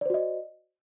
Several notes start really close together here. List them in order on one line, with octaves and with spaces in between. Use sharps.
D5 C5 F#4 D#5